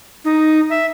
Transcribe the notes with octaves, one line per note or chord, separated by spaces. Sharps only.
D#4
E5